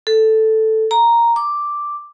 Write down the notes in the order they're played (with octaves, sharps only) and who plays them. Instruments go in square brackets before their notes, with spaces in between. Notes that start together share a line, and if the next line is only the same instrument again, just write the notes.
[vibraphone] A4
A#5
D6